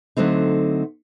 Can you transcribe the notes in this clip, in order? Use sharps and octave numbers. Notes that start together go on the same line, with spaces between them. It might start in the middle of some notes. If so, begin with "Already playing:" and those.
D3 F#3 A3 C4 D#4